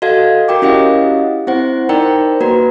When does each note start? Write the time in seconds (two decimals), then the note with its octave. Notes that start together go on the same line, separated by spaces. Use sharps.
0.02 F#4 A4 D#5 F5 G#6
0.48 F#4 A#4 G5 D6
0.62 C#4 E4 G4 D#5 F5 F#5
1.47 C4 E4 C5 F#5
1.89 D#4 A#4 C5 D5 G5 A#5
2.41 A#3 F#4 B4 A#5